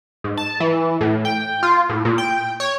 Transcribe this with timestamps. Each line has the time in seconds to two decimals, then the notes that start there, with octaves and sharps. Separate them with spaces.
0.24 G#2
0.37 A5
0.60 E3
1.01 A2
1.25 G5
1.63 F4
1.89 A2
2.05 A#2
2.18 G5
2.60 C#5